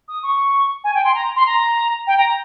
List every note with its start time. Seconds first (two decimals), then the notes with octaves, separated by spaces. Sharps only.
0.08 D#6
0.23 C#6
0.84 G#5
0.94 G5
1.04 C6
1.14 A#5
1.36 C6
1.46 A#5
2.07 G5
2.17 A#5